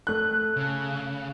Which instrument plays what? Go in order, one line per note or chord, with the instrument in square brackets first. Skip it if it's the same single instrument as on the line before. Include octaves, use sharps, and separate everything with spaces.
[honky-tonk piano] A3 F#6
[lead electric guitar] C#3